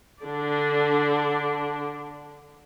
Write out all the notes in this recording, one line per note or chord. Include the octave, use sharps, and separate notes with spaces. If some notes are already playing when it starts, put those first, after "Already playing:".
D3 D4